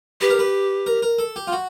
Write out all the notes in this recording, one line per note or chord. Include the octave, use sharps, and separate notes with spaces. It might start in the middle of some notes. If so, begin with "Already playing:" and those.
G4 B4
A#4
B4
A#4
A#4
A4
G4
F4
F#4